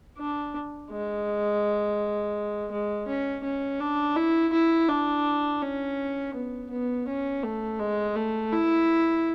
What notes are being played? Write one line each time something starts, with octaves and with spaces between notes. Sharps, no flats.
D4
G#3
G#3
C#4
C#4
D4
E4
E4
D4
C#4
B3
B3
C#4
A3
G#3
A3
E4